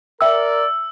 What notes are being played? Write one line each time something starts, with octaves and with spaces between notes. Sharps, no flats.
A#4 D5 E5 G5 E6